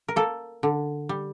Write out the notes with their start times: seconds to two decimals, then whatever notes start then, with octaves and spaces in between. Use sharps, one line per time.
0.08 A#4
0.16 A#3 A4
0.63 D3
1.09 G3